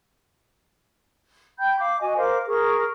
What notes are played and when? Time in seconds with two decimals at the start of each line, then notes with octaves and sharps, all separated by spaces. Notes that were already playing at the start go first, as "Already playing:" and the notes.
1.59 G5 B5 G6
1.80 F5 D6
2.01 F#4 D#5 G#5
2.17 A#4 C5 F5 D6
2.48 G#4 A#4 C#6